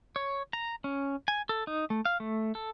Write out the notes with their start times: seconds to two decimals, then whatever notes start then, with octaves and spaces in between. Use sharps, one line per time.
0.16 C#5
0.53 A#5
0.84 C#4
1.28 G#5
1.49 A4
1.67 D#4
1.90 A3
2.05 F5
2.20 A3
2.55 A4